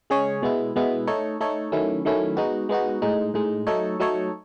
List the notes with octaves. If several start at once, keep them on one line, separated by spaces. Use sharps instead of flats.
C#3 G#3 C#4 G#4 C#5
B2 G#3 B3 E4
B2 G#3 B3 E4
A3 D#4 A4 C#5
A3 D#4 A4 C#5
D#3 F#3 A3 C#4 E4
D#3 F#3 A3 C#4 E4
G#3 B3 D#4 F#4
G#3 B3 D#4 F#4
A2 G#3 D#4
A2 G#3 D#4
F#3 A3 D#4 A4 C#5
F#3 A3 D#4 A4 C#5